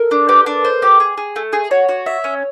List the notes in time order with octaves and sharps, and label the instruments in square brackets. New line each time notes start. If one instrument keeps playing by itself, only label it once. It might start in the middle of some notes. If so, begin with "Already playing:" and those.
Already playing: [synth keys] A4 A#4
[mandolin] D4
[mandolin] G4 [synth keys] B4
[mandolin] D4
C5
G4
G#4
G#4
A3
G#4
[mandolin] F#4 [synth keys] C#5
[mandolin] F#4
E5
C#4